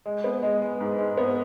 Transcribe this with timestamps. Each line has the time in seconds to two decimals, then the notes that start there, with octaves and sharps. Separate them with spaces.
0.06 G#3
0.24 B3
0.43 G#3
0.62 G#3
0.80 G#2
0.98 G#3
1.18 B3